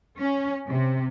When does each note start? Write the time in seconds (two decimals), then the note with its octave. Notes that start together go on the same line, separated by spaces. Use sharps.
0.20 C#4
0.69 C3